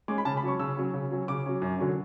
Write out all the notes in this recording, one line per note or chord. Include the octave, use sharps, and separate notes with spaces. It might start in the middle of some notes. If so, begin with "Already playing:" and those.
G#3 C#4 D6
B5
C#3 A5
B5
F#3 C#4 C#6
C#3 E6
F#3 C#4
C#3
F#3 C#4
C#3 D6
F#3 C#4
F#2
D3 F#3 C#4